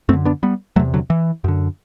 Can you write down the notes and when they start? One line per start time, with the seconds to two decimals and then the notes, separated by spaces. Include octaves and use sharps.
0.09 F#2 A3 C4
0.13 D3
0.25 B3 D4
0.43 G3 B3
0.76 E2 C3 F#3 A3
0.94 D3 F#3
1.10 E3
1.44 F#2 D3